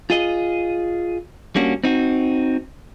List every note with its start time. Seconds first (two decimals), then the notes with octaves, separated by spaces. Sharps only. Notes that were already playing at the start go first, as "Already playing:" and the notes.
0.10 F4 G#4 D#5
1.56 G3 A#3 C#4 D4 F#4
1.84 C4 D#4 F#4